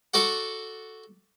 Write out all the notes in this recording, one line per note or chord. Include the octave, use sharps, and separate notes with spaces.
F#4 A4 D5 F#5